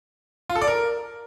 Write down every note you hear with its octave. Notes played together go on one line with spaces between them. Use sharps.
F4
A4
D5
A#4